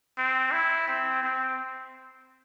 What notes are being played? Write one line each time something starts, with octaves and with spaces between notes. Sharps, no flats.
C4
E4
C4
C4